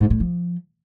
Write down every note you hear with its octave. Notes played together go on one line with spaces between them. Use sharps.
G#2
A2
F3